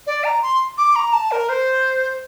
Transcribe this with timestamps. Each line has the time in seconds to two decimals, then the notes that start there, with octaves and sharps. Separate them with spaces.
0.07 D5
0.24 A#5
0.42 C6
0.78 D6
0.95 A#5
1.13 A5
1.31 A#4
1.49 C5